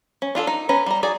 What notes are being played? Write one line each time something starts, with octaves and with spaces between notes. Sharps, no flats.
C#4
D4 F4 G#4 A4
D#4
B3 C#4 B4 A#5
G3 A#5
D#4 F#4 G#4 D5